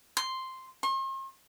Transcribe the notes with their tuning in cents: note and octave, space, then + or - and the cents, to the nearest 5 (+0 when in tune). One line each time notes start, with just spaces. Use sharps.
C6 +0
C6 +45